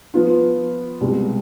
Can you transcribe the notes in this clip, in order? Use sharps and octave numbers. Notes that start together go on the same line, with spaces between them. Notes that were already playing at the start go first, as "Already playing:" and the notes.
F3 B3 F4
C2 B2 G#3